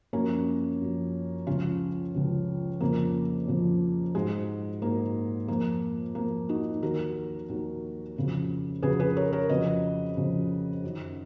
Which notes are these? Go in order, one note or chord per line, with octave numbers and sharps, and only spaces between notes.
F#2 F3 A#3 C#4
F#2 F3
C#2 C#3 F3 C#4 F4
C#2 C#3 F3
F2 C#3 F3 A#3
F2 C#3 F3
G#2 F#3 G#3
G#2 F#3 A#3
F2 F3 A#3
F2 F3 A#3
D#4 F#4
D#2 D#3 F#3 F#4 A#4
D#2 D#3 F#3
F2 C#3 F#3
F2 C#3 F#3 G#4 B4
G#4 B4
A#4 C#5
A#4 C#5
F2 C#3 F#3 B4 D#5
F2 C#3 F#3
F#2 D#3 F#3